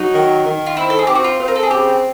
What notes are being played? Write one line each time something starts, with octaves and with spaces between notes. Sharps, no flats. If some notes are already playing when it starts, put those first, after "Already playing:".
Already playing: F#3 D#4
D#3
D#3
F4
C4 E4
A4
G#4
C4 G4
F#4
F4
C4
A#4
A4
G#4
C#3 G4